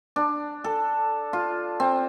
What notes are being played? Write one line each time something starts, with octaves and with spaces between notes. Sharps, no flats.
D4
A4
F4
C4